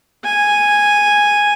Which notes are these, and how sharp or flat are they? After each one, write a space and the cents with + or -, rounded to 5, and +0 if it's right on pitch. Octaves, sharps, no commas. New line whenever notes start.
G#5 -5